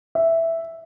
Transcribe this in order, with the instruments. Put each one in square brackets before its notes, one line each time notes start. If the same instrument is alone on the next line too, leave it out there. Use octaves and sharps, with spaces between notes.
[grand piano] E5